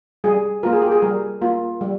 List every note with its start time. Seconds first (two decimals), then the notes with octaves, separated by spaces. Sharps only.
0.24 G3 G#4
0.63 A#3 F4 A#4
0.73 G#4
0.82 G4
0.92 G#4
1.02 G3 A#4
1.41 A#3 F4
1.81 G3